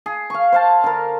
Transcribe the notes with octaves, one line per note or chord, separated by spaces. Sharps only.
G#4
F5 C#6
C5 F5 A5
D3 A#4